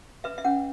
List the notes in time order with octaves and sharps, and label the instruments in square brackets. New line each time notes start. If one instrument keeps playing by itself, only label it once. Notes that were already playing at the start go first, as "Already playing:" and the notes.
[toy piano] B4 E5
E5
C#4 F#5